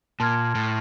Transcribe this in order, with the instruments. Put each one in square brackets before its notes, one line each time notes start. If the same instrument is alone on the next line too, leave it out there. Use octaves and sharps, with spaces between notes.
[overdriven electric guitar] A#2 [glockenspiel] A5 C6 F6 G#6
[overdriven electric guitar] A2